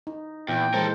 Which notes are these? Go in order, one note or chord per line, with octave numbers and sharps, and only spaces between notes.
D#4
E2 A#2 G5
E3 G#3 A4 A#4 C5